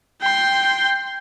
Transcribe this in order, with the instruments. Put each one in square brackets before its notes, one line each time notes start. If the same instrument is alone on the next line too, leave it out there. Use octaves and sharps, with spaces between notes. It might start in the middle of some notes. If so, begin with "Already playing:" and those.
[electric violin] G5 C6